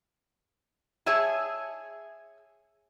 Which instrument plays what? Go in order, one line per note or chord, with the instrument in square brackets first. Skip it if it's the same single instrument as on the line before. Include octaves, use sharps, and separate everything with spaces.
[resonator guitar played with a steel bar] G#4 C#5 E5 G#5 A5